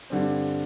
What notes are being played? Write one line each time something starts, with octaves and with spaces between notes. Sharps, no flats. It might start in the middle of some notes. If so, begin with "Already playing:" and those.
G2 D3 G3 C4